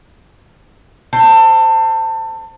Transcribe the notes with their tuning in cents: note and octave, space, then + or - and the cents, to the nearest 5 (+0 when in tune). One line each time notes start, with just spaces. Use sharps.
A4 +25 C5 +0